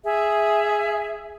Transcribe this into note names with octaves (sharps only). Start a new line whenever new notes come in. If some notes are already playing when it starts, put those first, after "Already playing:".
G#4 E5